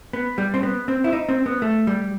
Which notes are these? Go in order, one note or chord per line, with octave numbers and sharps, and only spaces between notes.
B3
G3
C4
B3
C4
E4
D#4
C4
B3
A3
G3